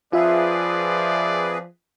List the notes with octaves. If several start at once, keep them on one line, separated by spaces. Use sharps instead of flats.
F3 C4 F4 G#4 B4 D5 E5